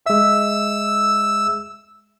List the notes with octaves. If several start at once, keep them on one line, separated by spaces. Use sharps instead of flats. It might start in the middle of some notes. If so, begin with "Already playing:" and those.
G#3 E5 E6